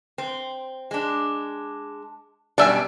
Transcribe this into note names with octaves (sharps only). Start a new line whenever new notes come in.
C4
G#3 D4
F#2 B2 G3 D4 E5 G#5